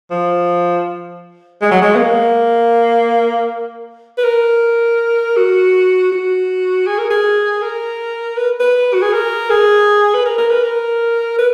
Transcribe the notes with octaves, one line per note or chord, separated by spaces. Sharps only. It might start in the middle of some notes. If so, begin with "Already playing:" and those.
F3
G#3
F#3
G#3
B3
A#3
B4
A#4
F#4
F#4
G#4
A#4
G#4
A#4
B4
B4
F#4
G#4
A#4
G#4
B4
A#4
A#4
B4
A#4
B4